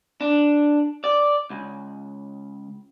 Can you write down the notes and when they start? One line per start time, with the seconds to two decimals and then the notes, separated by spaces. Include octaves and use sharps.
0.21 D4
1.04 D5
1.50 C#2